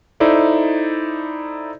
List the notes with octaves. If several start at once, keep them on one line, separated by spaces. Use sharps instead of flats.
D#4 E4 A4 C5 D5 E5